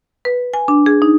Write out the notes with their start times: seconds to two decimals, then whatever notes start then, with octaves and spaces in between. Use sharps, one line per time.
0.25 B4
0.54 G#5
0.68 D4
0.86 G#4
1.02 D#4